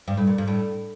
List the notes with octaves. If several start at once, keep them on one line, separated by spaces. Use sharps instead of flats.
G2
A2
A#2
G2
A2